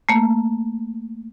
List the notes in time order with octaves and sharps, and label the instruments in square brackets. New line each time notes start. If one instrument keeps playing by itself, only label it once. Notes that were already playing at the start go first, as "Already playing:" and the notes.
[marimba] A3 A#3